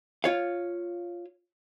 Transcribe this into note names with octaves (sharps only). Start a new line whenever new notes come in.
F4 C#5 F5